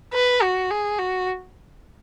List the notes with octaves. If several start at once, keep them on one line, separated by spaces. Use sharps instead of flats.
B4
F#4
G#4
F#4